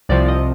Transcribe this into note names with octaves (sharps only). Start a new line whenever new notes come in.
C2 C3 F3 D5
D#5